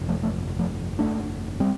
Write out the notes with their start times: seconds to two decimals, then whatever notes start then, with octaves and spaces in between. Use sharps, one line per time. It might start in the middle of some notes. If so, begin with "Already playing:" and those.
Already playing: G1 F2 C3
0.09 F3 A3
0.23 F3 A3
0.59 F3 A3
0.99 A3 D4
1.60 G3 C4